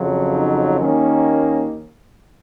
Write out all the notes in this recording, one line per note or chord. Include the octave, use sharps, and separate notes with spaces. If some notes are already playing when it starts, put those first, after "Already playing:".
Already playing: F2 C#3 F#3
D#4
D#2 D#3 A#3 C#4